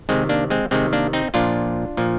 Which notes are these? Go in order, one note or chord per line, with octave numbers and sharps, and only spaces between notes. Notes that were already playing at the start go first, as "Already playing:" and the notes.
C3 D#3 G#3 C4
A#3 D4
G#3 C4
C3 D#3 G#3 C4
A#3 D4
C4 D#4
A#2 F3 D4 F4
A#2 F3